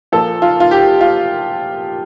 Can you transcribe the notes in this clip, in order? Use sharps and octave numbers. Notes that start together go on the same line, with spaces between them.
A#2 F3 A4
F4
F4
G4
F4